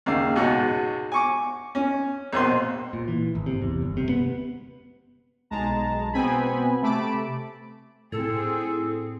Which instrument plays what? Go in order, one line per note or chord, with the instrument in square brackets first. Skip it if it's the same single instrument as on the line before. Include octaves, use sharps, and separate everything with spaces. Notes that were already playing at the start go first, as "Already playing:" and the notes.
[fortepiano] D#2 C#3 F5
C#2 G#2 B2 F#4
G#5 C#6 D6
C#4
A#1 B2 C4 C6
[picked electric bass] A#2
E3
G#1
C3
E2
G1
C3
B3
[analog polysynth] B1 G#3 A5 A#5
B2 B3 C4 G#5 B5
C3 A3 A5 B5 D6 D7
[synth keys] A2 [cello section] C4 G#4 [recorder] A4